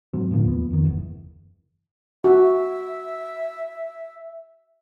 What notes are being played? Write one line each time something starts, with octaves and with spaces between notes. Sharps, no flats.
G#2 F#3 C4
A2 D3 F3 A#3
D#2 F3 B3
F2 D#3
F#1 E2
F#4 E5